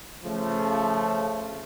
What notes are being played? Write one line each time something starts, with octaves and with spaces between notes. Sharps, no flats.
C#3 F3 A3